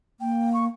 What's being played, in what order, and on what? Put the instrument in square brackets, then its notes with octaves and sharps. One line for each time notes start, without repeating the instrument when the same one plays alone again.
[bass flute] A#3 [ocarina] G5
[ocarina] C#6